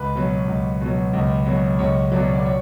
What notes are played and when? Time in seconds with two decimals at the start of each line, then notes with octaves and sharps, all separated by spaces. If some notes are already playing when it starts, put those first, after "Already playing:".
Already playing: C#2 B4
0.15 B2 F#3
0.48 C#2
0.81 B2 F#3
1.13 C#2
1.46 B2 F#3
1.79 C#2 C#5
2.12 B2 F#3 D5
2.35 D5
2.45 C#5